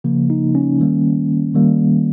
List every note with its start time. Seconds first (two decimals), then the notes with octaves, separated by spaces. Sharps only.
0.04 C#3 F3 A#3
0.30 D#4
0.55 C#4
0.79 D#3 G3 A#3
1.54 D#3 G3 A#3